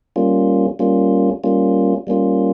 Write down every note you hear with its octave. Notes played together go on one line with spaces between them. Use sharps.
G3 A#3 C#4 F4
G3 A#3 C#4 F4
G3 A#3 C#4 F4
G3 A#3 C#4 F4